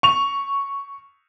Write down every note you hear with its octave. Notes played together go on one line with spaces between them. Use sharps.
C#6 F7